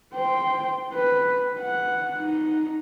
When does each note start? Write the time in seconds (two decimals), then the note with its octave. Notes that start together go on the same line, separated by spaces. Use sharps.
0.14 C5 G5
0.94 B4
1.60 F#5
2.19 D#4